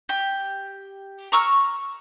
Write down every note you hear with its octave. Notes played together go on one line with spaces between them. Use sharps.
G4
A#5 C#6 E6 F6